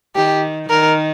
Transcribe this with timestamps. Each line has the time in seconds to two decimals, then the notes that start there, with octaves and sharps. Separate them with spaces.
0.15 D#3 G4
0.70 D#3 A#4